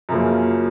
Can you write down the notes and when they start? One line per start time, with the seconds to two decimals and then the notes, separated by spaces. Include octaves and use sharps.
0.09 F#2 C#3 F3 A#3